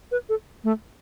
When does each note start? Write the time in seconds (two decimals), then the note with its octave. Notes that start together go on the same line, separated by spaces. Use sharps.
0.12 B4
0.29 A4
0.64 A3